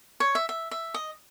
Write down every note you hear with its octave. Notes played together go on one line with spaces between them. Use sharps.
C#5
E5
E5
E5
D#5